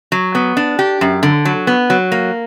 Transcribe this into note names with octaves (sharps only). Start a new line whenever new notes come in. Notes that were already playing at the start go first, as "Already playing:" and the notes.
F#3
B3
D4
G4
F#2
D3
F#3
B3
F#3
A#3